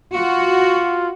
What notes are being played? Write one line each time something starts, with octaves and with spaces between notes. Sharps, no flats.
F4 F#4